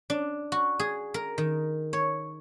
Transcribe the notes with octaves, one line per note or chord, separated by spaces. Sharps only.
D4
F#4
G#4
A#4
D#3
C#5